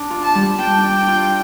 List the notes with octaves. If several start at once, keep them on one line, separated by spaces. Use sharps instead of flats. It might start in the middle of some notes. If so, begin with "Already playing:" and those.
Already playing: D4
F4
A5
G3
D4 G5
D4
F4